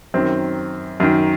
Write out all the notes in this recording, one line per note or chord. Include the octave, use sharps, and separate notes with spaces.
F#2 D#3 C4
F#2 D#3